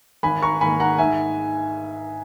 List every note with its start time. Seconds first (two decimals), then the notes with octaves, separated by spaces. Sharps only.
0.23 G#1 G#5 B5
0.42 A#5 C#6
0.61 G#2 D#3 A#3 G#5 B5
0.80 F#5 A#5
0.98 G#2 E5 G#5